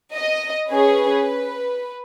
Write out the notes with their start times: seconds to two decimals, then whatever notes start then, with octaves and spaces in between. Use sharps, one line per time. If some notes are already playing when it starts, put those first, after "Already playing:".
0.15 D#5
0.71 C#4 G#4 B4